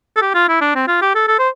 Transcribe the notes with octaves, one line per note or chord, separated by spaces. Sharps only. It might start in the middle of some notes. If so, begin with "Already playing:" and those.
A4
G4
F4
E4
D4
C4
F4
G4
A4
A4
C5